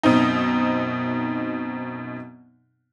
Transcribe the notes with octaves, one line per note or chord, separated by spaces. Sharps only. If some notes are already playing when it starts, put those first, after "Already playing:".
F#2 B2 C4 D#4